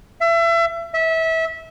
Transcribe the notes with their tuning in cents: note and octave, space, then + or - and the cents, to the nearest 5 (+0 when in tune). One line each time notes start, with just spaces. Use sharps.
E5 +30
E5 -25